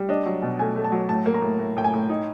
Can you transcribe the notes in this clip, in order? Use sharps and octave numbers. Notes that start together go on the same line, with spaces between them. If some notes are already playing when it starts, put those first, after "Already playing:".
Already playing: G3
D4 D#5
F#3
B2
A3 G#5
A3
A5
F#3
A2 A5
A#3
A#5
A2
A2
A2 G5
G#5
A2
D#4